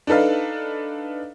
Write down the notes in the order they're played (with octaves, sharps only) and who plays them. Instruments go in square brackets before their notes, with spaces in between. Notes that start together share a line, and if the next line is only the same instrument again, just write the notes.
[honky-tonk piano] D4 D#4 A4 B4 F5